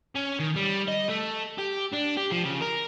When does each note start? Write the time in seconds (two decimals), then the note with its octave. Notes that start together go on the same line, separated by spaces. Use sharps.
0.15 C#4
0.39 D#3
0.56 G3
0.88 D#5
1.09 A3
1.58 G4
1.92 D4
2.17 G4
2.32 F3
2.44 C#3
2.62 A#4